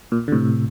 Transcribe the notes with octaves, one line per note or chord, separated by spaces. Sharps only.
A#2
D3
A2 C3